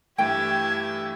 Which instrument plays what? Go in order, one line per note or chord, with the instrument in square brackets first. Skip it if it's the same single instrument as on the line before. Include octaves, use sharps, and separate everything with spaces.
[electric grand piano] G2 E3 A3 [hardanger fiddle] G4 E5 [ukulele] G5 [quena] G#6